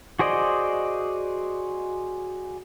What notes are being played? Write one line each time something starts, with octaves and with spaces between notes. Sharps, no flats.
F#4 G#4 C5 D5 D#5